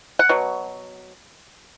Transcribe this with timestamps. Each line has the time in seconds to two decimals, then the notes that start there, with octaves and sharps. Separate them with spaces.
0.19 F#5
0.29 B2 F#3